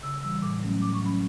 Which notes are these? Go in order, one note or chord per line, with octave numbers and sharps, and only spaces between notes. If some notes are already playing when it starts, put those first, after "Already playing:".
C#3 E6
E3 G3 E6
A2 D6
F#3 A3 C#4
A2 D6
C#6
F#3 C#4 B5